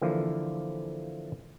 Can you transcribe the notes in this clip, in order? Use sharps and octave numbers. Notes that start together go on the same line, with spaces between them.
D3 E3 F3 A#3